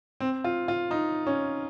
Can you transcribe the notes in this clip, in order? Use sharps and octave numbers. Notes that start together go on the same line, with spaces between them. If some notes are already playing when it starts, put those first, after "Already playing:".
C4
F4
F4
D#4
C#4